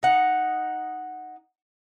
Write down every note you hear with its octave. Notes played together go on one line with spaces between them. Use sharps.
D#4 F#5